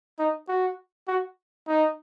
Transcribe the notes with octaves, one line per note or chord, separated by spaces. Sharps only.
D#4
F#4
F#4
D#4